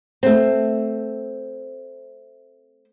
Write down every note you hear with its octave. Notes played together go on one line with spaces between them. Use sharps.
A3 C4